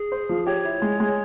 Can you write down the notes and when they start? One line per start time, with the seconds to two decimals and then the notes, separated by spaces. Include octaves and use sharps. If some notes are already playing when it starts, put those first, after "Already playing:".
Already playing: G#4
0.12 C5
0.29 F3
0.46 G4 C#5
0.65 E4
0.82 G#3
1.00 G#3